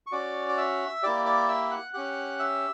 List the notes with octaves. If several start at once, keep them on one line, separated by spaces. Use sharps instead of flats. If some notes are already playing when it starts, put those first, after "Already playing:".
C#6
C#4 F#4 D5 D6
D6
E5 E6
A#3 E4 G4 D5 D6
D5 D6
E5 E6
F#5 F#6
C#4 G4 F#5 F#6
E5 E6